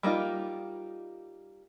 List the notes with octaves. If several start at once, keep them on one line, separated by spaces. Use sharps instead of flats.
G3 A#3 D#4 F4